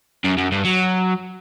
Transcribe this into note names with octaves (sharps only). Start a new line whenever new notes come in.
F#2
F#2
G2
F#3